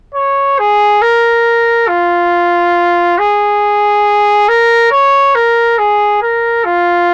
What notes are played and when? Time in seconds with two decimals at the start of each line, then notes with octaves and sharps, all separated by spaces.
0.15 C#5
0.59 G#4
1.02 A#4
1.88 F4
3.18 G#4
4.48 A#4
4.91 C#5
5.35 A#4
5.78 G#4
6.22 A#4
6.65 F4